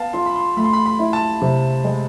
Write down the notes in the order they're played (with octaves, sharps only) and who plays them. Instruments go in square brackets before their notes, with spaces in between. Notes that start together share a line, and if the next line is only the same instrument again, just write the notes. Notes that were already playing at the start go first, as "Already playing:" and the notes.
Already playing: [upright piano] B3 [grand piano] F5 A5
[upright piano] F4 [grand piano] C6
[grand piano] B5
C6
[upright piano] A3 [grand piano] B5
[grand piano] C6
B5
B5
[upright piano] E4
[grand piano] A5
[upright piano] C3
G#3